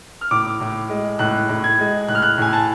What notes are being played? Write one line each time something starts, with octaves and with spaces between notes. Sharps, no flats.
F6
A2 D6
A2
G#3
A2 F#6
A2
G#6
G#3
A2 F#6
F6
F#6
A2 G#5
A5